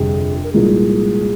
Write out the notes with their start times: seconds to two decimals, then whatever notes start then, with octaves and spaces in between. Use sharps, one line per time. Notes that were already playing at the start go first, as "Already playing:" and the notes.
Already playing: G1 F2 C3 G#4
0.44 A#4
0.53 C2 A#2 F3 G#3 D#4 G#4